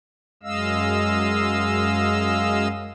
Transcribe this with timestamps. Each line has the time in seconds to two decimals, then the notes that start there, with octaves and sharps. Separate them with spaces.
0.43 F#2 G#3 D#5 F5 E6